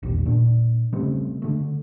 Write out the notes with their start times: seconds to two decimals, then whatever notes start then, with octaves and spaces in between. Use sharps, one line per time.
0.03 E1 A#1 D#2
0.26 A#2 D4
0.93 C#3 G3 A3 C4
1.42 D3 A3